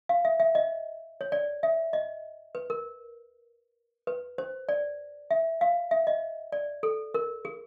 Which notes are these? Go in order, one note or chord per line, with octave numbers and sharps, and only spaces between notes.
F5
E5
E5
D#5
C#5
D5
E5
D#5
B4
A#4
B4
C5
D5
E5
F5
E5
D#5
D5
A4
A#4
G#4